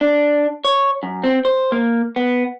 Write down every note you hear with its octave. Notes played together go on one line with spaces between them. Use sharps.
D4
C#5
F#2
C4
C5
A#3
B3